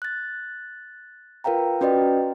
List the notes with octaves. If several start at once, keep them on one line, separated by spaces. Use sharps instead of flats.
F#6 A6
F4 A#4 B4 F5 G5 A#5
C#4 F#4 B4 D5 D#5 G5